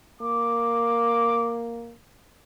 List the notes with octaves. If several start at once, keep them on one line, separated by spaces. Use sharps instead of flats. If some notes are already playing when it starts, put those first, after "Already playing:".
A#3 D6